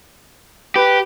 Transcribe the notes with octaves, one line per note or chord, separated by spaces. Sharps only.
G4 B4